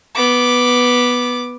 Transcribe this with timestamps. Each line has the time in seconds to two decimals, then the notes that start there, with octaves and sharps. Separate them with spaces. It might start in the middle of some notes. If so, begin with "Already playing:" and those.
0.15 B3 D6